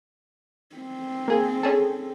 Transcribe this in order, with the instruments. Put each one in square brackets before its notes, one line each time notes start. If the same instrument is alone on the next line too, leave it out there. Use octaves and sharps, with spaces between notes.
[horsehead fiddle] C4
[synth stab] A#3 G#4
C#4 G#4 A4